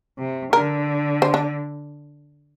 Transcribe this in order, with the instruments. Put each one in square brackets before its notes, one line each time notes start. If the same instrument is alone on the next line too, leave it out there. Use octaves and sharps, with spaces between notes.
[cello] C3
[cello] D3 [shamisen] A#4
[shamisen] C5
D4